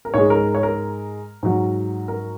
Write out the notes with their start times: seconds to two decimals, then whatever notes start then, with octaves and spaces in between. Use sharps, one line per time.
0.05 A#4
0.14 G#2 G#3 C#5
0.30 A#4
0.55 C#5
0.63 A#4
1.43 G#2 F#3
2.08 A#4